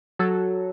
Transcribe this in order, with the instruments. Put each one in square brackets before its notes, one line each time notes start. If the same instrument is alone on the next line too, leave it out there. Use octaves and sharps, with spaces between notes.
[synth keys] F#3 A4